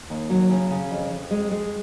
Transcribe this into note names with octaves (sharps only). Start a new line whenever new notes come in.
D#2
F#3
C#3
C#3
F2
F2
G#3
G#3